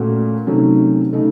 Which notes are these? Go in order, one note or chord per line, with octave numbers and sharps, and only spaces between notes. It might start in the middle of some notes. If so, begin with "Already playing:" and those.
Already playing: A#2 A3 C#4 F#4
C3 D#3 F#3 A3 C#4
C#3 A3 D#4